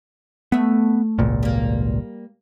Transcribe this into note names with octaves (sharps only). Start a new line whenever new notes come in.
A3 B3 E5
G#1 C#2 A#2
G3 A#3